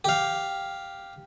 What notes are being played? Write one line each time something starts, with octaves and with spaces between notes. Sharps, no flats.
G4 F5